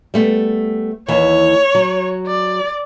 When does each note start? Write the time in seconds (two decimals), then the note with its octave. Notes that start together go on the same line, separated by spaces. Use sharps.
0.14 G3 A3 B3
1.08 D#2 E3 C#5
1.75 F#3
2.27 D5